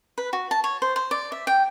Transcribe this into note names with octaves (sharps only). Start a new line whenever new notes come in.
B4
F#4
A5
C#5
C5
C5
D5
E5
G5